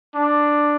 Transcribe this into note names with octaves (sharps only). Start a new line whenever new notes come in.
D4